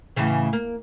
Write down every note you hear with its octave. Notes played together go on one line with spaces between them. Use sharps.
A2 C#3 E3
A#3